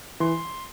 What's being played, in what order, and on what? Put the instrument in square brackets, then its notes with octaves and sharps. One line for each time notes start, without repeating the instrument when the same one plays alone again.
[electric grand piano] E3 [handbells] C6